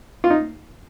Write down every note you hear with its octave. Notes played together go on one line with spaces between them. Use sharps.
F4
D#4